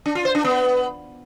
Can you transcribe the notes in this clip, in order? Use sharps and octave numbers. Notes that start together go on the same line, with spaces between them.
D4
F4
C5
D4
B3